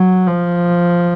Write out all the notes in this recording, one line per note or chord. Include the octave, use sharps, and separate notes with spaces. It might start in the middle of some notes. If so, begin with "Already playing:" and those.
Already playing: F#3
F3